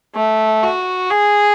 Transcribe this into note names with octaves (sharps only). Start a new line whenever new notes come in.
A3
F#4
G#4